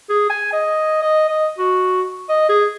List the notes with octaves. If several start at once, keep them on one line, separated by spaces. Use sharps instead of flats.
G#4
G#5
D#5
D#5
D#5
F#4
D#5
G#4